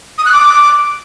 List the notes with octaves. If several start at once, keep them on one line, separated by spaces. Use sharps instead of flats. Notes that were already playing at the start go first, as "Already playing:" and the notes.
D#6
F#6
D6